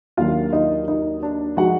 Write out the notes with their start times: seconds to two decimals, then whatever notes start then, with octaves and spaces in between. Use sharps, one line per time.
0.17 D#2 D#3 F#3 A#3 D4 F4 F5
0.53 D#4 D#5
0.88 D#4 D#5
1.23 D4 D5
1.57 F3 G#3 D#4 F#4 F#5